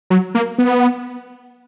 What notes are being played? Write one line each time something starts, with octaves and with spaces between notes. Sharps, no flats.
F#3
A#3
B3